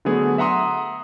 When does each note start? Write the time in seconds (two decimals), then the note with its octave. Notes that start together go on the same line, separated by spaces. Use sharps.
0.05 D3 F#3 A3 B3 G#4
0.38 E5 F#5 A#5 C6 D#6